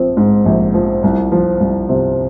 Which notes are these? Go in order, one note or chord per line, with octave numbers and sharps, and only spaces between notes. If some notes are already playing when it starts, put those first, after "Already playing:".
Already playing: A#1 F3 C4
G#2
A#1
F3
C2
F3
C2
C3